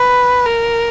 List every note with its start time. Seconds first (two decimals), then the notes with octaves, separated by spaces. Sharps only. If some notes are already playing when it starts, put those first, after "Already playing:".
Already playing: B4
0.46 A#4